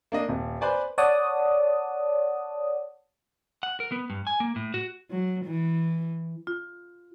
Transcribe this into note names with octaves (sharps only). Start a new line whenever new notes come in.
A#3 D4 D#5
D#1
B4 C5 D5 G#5
C#5 D5 F#5 A5 D#6
F#5
A#4
B3
G2
G#5
A#3
A2
F#4
F#3
E3
F4